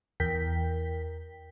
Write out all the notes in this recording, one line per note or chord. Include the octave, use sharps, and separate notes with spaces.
E2 A#4 G5 B6